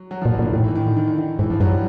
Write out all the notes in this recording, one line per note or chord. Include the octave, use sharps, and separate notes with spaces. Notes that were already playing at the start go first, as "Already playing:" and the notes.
Already playing: F#3
F#3
A#2 F3
E3
A#2
D3
A2 D#3
E3
D#3
D3
D#3
D3
D#3
G#2 E3
F3
G2 F#3
G3